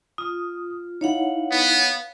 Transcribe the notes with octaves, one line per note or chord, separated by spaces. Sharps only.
F4 D#6
D#4 E4 C#5 F5 F#5
B3